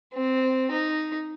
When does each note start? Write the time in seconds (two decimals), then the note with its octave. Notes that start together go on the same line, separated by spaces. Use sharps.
0.13 C4
0.71 D#4